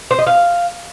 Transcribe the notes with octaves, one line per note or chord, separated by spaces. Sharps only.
C5
D#5
F5